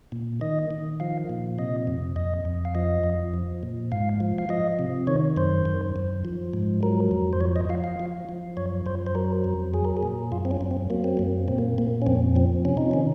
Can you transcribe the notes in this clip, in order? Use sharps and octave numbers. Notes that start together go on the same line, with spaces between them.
A#2
D#3 D#5
D#3
F3 F5
A#2
C3 D#5
F2
F2 D#5
F2
F5
F3 D#5
F2
F3
A#2
G#2 F5
F3
F5
F3 D#5
C3
D#3 C#5
F#2 C5
F#2
F#2
F3
G#2
F#3 A#4
F2
C5
F3 C#5
D#5
F3 F5
F5
F3
F3
F#2 C#5
F#2 C5
C5
F#3 A#4
F2
F#3 G#4
A#4
G#4
A#2
F#2 F4
C4
C#4
F#2
C4
F#3 A#3
C4
F#2 A#3
A#2 C4
A#3
A#2 A#3
C#4
F2 C4
F3 C4
C3 C#4
D#4
D#3 C#4